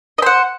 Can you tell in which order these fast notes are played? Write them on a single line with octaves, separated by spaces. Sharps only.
D#5 C5 F#5